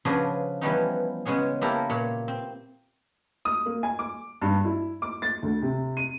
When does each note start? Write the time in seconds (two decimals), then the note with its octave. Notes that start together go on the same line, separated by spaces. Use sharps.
0.05 C#3 F3 D4 F#4 G#4 B4
0.61 E3 F3 G3 B3 C#4 D#4
1.25 C#3 G#3 B3 C#4 G#4
1.61 A#3 E4 G4 A4 A#4
1.90 A#2 C#5
2.28 C4
3.45 D#6
3.66 A#3
3.83 G#5
3.99 D6
4.42 G2
4.65 E4
5.02 D6
5.22 A6
5.43 D2
5.62 C3
5.97 D#7